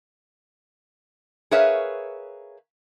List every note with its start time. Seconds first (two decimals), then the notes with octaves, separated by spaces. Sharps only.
1.51 G#4 A#4 B4 C#5 E5 F5